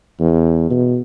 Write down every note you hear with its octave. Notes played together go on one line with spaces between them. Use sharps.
E2
B2